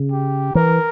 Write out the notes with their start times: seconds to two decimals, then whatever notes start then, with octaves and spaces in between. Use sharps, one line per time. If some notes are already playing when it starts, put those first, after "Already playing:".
Already playing: C#3
0.11 G4
0.55 E3 A#4